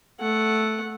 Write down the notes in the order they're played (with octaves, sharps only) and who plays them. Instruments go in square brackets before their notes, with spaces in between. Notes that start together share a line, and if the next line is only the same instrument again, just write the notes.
[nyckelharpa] A3 F#5